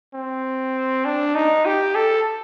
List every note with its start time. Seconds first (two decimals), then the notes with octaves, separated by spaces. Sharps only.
0.14 C4
1.05 D4
1.35 D#4
1.65 G4
1.95 A4